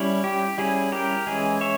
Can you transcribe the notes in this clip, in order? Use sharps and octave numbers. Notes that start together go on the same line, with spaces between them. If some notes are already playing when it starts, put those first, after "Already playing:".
Already playing: G3 C#4 E4
G4
G3 C#4 E4 G#4
G4 A#4
E3 G#3 C#4 E4 G#4
C#5 E5